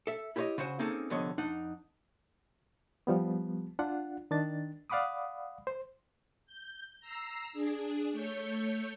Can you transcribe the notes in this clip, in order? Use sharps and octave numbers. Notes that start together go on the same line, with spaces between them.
A4 E5
E4 G4 A4 C5 C#5 D#5
C#3 F#4 C5 F#5 G#5
A#3 C4 C#4 D#4 G#4 A4
C2 D3 F3 B3 C#5 D#5
F2 D4 D#4 F#5
F3 G3 B3
D4 F4 F#5
D#3 D4 A6
D5 F5 F#5 B5 D6 D#6
C5
G6
A#5 E6 C7
D4 G#4
A3 C#5 G6 C#7